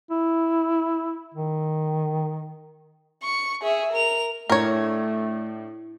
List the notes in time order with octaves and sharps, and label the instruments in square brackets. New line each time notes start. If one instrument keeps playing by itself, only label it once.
[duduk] E4
D#3
[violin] C#6
G#4 E5
A#4 F7
[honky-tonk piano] A2 D4 [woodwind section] A3 [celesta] E4 [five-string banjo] A#4 C#5